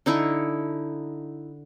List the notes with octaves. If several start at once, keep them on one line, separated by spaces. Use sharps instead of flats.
D3 D#4 E4 C#6